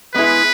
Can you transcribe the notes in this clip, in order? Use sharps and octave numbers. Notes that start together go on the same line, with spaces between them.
G#3 B3 E4 G#4 B4